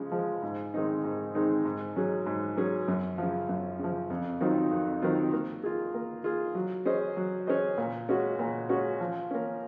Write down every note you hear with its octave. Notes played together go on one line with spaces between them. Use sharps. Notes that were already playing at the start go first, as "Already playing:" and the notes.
Already playing: C#3 F3 G#3
F3 G#3
G#2
D#3 G#3 C4 D#4
G#2
D#3 G#3 C4 D#4
G#2
F#3 C#4 G#4
G#2
F#3 C#4 G#4
F#2
C#3 F3
F#2
C#3 F3
F2
D#3 F#3 C4 F4
F2
D#3 F#3 C4 F4
A#3
F4 G#4
A#3
F4 G#4
F#3
C#4 G#4 C5 D#5
F#3
C#4 G#4 C5 D#5
A#2
G#3 C#4 F#4
A#2
G#3 C#4 F#4
F3
A#3 C#4